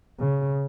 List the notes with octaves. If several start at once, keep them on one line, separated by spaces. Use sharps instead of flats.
C#3